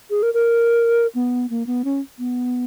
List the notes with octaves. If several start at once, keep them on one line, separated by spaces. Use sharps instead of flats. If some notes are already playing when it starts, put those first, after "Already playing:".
G#4
A#4
A#4
B3
A#3
B3
C#4
B3